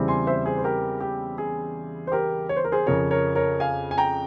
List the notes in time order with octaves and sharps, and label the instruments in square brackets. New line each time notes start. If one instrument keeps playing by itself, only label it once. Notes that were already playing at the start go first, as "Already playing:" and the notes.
Already playing: [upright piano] E2 C#3 G3 C4 E4
G#5 C6
C5 E5
G#4 C5
C5
G4 A#4
G4
G#4
C5
G4 A#4
C#5
C5
A#4
G#4 C5
F2 C#3 F3 A#4 C#5
A#4 C#5
A#4 C#5
F5 G#5
G#5
G5 A#5